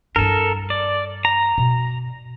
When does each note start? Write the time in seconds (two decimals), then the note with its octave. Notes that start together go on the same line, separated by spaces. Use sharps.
0.16 G2 E4 A4 A#4
0.70 D5
1.25 A#5
1.58 B2